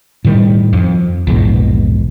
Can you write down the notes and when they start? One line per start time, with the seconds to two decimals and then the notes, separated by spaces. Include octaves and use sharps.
0.25 A2 D#3 E3 G3
0.73 F2
1.27 A#1 E2 G#2 B2